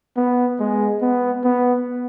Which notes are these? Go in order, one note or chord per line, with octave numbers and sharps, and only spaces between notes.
B3
G#3
B3
B3